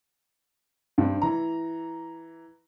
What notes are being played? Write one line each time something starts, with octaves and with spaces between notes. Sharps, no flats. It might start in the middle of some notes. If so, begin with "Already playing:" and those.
G2 C4
E3 A#5